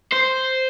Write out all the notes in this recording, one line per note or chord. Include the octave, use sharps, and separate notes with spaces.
C5